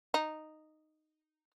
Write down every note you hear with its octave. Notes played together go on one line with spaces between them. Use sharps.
D#4